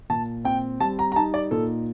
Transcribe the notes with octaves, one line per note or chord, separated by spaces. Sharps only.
A#2 A5
C4 G5
G3 A5
A#5
A#5
D#4 A5
D5
A#2 A4